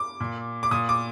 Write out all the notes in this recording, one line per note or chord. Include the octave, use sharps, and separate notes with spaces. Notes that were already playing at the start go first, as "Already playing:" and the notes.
Already playing: D6
A#2
D6
A#2 D#6
D6